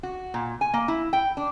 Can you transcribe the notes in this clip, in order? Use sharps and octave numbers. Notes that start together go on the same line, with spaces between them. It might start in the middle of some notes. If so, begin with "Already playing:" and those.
F#4
A#2
G#5
A#3
E4
G5
D4